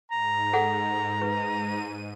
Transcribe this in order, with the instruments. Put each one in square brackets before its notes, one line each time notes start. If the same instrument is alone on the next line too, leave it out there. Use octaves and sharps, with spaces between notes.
[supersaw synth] G#2 [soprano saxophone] A#5
[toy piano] G#4 A4 F#5
[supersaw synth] G#2 D#7 [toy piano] B4